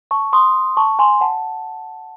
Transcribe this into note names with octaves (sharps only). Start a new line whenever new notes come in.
A5 C#6
C6 D#6
A5 C#6
G#5 C6
F#5 A5